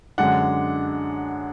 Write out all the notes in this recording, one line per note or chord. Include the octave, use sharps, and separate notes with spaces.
F#2 D3 G#3 D4 F#5